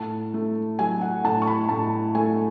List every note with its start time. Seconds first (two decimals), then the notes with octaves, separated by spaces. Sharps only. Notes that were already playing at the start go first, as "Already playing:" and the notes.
Already playing: A2 A5
0.34 A3
0.79 F#3 G#5
1.01 F#5
1.24 A2 A5
1.42 C#6
1.47 B5
1.69 A2 A5
2.15 A3 G#5